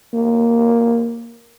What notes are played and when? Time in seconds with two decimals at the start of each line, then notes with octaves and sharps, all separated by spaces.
0.14 A#3